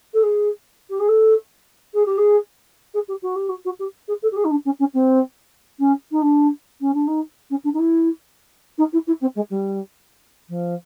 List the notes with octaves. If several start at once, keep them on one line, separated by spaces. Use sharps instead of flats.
A4
G#4
G4
G#4
A4
G#4
G4
G#4
G#4
G4
F#4
G4
F#4
F#4
G4
G#4
A4
G4
G#4
D#4
D4
C#4
C#4
C4
C#4
D#4
D4
C#4
D4
D#4
C#4
D4
D#4
E4
D#4
E4
E4
C4
G#3
G3
F3